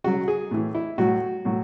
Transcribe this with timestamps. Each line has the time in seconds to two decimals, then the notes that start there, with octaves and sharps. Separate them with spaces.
0.04 C#3 F#3 F#4
0.28 G#4
0.51 A2 E3
0.75 E4
0.98 A2 F#3 F#4
1.45 A2 F#3